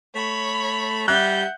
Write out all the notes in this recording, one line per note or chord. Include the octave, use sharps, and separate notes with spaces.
A3 C#5 B5
G3 E5 F#5 F#6 G6